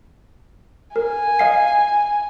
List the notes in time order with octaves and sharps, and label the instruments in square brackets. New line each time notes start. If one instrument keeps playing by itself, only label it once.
[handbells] A#4 [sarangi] G#5
[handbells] D#5 F5 C7